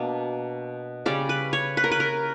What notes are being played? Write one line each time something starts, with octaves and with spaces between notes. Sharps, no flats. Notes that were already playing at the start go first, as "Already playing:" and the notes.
Already playing: B2 A#3 D4
C#3 G3 C#4 D5
B4
C#5
B4
A#4
B4
A#4